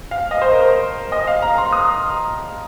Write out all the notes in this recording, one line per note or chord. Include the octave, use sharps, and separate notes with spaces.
F5
D#5
C5
A#4
C5
D#5
F5
A#5
C6
D#6